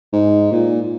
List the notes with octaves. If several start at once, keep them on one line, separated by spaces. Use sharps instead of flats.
G#2
A#2